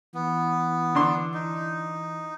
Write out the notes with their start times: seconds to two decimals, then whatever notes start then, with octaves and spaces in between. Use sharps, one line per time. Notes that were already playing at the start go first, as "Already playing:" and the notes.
0.14 E3 B3
0.95 D3 D4 C6
1.34 D#4